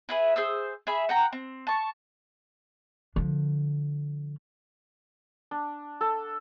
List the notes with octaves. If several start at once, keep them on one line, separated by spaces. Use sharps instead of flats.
E4 G#4 B4
G#4 C5 E6
G#4 E5 B5
F#5 G5 A#5
C4
A5 C#6
D3 F3
D4
A4